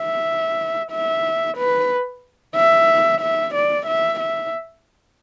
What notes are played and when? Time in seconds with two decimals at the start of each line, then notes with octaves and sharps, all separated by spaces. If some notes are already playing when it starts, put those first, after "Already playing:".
Already playing: E5
0.92 E5
1.58 B4
2.56 E5
3.21 E5
3.55 D5
3.86 E5
4.20 E5